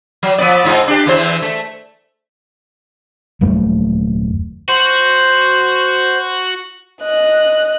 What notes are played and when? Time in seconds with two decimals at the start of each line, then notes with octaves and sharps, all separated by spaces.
0.23 F#3
0.38 F3 B3 D5
0.64 G#2 D#4 F4
0.88 D4 G4
1.06 E2 E3 C5
1.42 A3
3.41 D#1 F#2 G3 A3
4.69 F#4 C5
7.03 D#5 F#6